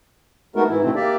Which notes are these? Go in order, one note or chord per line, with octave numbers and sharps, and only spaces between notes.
G#3 A3 B3 D#4 F#4 A#4
G#2 E3 E4
G#2 B2 D3 A3 C4
A#3 G4 D5 E5